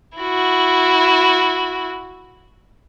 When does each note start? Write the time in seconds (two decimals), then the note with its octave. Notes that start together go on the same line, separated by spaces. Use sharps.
0.18 E4 F#4